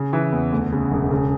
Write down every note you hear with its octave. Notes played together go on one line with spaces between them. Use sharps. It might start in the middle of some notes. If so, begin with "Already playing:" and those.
Already playing: C#3
E3
E2
D2
C#3
E1
C#3